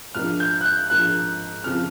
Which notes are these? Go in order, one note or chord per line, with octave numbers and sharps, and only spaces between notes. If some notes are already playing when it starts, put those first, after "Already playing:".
G#2 F3 A#3 D4 F6
G6
F#6
G6
G#2 F3 A#3 D4 F#6
F2 C#3 F3 F6